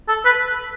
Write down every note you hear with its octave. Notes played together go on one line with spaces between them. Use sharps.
A4
B4